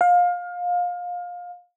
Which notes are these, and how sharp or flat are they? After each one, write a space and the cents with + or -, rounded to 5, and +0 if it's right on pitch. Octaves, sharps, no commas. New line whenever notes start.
F5 +25